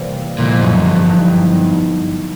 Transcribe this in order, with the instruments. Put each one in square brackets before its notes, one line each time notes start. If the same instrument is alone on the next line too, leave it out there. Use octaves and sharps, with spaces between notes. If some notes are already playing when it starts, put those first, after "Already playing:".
Already playing: [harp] C3 E3 G3 A#3
[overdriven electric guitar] A#2 [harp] D3 F3 G#3 B3 E4
[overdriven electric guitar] F#2
G2
[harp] F#3 B3 D#4